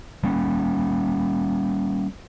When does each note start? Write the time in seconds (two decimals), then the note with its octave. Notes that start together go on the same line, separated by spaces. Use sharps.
0.24 G3 A#3 C#4